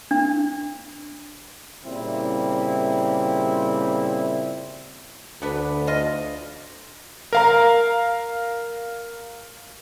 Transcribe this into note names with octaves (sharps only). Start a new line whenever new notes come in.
D4
A#2 C#3 G3 C4 E4
D2 B3 D4 B4
F4 D#5
A#4 F5 A#5